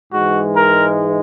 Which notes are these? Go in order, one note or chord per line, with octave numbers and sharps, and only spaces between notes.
G#2 E3 G#3 F#4
A#4